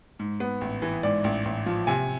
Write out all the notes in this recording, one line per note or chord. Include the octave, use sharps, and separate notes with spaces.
G#2
B3
A1
E3
G#2 D5
A1
A1
F3
C3 G#5